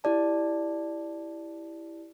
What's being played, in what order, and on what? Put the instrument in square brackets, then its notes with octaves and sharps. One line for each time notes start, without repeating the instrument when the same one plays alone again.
[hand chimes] E4 G4 D5 A5